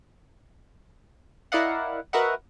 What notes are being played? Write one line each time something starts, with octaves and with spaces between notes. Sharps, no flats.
E4 A#4 D5 D#5 F5 F#5
F#4 A#4 B4 D#5 E5 F#5